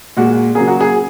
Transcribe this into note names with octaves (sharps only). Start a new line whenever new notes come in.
A#2 G#3 F#4
C#3 F#3 A#3 G#4
F#4
G#4